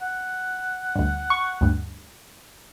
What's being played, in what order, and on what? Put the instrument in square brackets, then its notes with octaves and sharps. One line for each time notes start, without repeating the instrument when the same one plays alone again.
[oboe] F#5
[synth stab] D2 G2
C#6
D2 G2